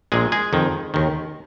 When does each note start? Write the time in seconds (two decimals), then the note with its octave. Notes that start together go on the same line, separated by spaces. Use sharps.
0.12 A#1 A#2 G#3 G#4
0.32 G#3 G#4
0.53 F2 D#3
0.94 D#2 D#3